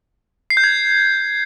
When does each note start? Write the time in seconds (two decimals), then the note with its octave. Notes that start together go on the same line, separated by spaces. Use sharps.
0.50 C7
0.57 G6
0.64 G#6